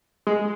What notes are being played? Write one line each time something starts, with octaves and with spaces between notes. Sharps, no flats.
G#3